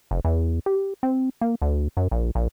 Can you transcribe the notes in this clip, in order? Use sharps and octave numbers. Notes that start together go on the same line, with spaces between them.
F1
E2
G4
C4
A#3
D2
F#2
A#1
A#1